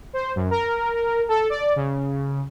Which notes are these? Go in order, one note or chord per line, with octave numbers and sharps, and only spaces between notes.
C5
F#2
A#4
A4
D5
C#3